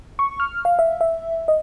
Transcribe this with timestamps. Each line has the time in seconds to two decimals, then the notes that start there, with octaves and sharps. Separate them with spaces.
0.19 C#6
0.40 F6
0.65 F5
0.79 E5
1.01 E5
1.48 D#5